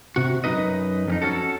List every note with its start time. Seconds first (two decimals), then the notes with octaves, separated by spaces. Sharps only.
0.16 C3 F#4
0.44 F#2 D#3 D#4 B4 D#5
1.07 F2 C#4 D#4
1.22 C#4 F#4 A4